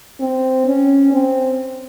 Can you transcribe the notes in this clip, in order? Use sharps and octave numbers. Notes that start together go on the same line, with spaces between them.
C4
C#4
C4